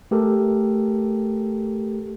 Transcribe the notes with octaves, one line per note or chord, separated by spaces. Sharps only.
A3 G4 A4 A#4